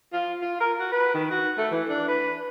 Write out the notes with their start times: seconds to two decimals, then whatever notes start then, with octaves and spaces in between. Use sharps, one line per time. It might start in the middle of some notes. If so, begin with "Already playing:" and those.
0.13 F4
0.42 F4
0.60 A#4
0.80 F#4
0.92 B4
1.14 D#3
1.31 F#4
1.58 A3
1.71 E3
1.89 D4
2.08 B4